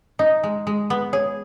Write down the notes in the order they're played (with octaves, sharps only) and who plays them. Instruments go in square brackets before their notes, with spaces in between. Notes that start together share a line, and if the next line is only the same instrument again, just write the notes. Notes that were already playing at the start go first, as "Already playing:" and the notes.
[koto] D#4 [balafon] D#5
[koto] G#3
G#3
B3
[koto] G#4 [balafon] C#5